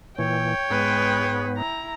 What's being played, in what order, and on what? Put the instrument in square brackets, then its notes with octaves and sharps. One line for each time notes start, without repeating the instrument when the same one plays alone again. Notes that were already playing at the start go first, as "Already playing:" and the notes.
[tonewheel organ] A#2 E3 [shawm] C#5 [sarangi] G5
[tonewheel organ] G#2 B3 [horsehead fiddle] G#3 B4
[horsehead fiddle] E4 [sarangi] A#5